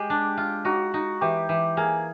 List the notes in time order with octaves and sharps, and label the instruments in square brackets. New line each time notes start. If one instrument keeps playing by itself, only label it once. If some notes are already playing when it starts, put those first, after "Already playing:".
Already playing: [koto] G#3 [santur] G4
[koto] D4
F4
[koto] D#4 [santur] F#4
[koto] D#4
[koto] E3 [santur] G4
[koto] E3
[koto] A#3 [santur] G#4